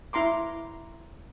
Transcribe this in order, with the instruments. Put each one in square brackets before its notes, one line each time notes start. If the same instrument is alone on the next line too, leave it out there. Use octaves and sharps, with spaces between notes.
[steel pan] E4 A#5 C6 D6